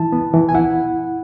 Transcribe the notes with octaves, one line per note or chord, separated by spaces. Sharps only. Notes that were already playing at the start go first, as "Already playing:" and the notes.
Already playing: E3 E4 A5
B3
E3
G#5
E4 F#5